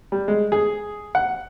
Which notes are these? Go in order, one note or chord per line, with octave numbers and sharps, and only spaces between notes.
G3
G#3
G#4
F#5